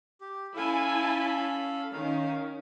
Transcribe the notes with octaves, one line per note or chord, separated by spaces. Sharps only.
G4
C#4 E4 A4 F5 G#5 A5 B5
D#3 C#4 F5